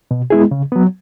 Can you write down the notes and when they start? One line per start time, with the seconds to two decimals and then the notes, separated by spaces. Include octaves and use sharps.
0.11 B2
0.30 G#3 B3 E4 G#4
0.51 C#3
0.72 F#3 B3